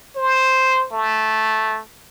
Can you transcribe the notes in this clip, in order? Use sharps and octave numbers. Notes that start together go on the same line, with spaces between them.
C5
A3